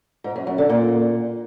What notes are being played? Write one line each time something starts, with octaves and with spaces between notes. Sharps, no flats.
G#2
F#2
F#2
D3
A#2